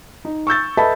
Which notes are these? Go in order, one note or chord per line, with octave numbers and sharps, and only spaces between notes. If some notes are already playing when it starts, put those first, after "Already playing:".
D#4
C#6 E6 G6 A6
A4 B4 D#5 E5 A5 B5